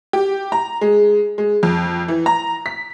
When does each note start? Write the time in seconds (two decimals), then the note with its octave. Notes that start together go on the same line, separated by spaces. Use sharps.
0.13 G4
0.52 A#5
0.81 G#3
1.38 G#3
1.63 F2
2.08 E3
2.26 A#5
2.66 B6